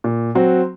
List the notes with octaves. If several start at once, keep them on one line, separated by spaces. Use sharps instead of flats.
A#2
F#3 C4 F#4